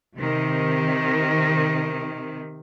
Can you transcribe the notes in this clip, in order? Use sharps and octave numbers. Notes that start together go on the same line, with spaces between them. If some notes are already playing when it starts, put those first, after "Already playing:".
C3 D#3